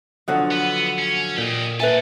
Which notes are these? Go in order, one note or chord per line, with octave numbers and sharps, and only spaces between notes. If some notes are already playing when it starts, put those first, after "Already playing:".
D3 F3 F#3 D#5 F#5
B3
C#4
A#2 G4 D#5
A#3 A4 B4 E5 G#5